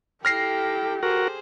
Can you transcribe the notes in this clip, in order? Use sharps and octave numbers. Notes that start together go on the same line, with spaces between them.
E4 G4 A4 G5 F6 A#6 C7
F#4 G#4 A#4 C5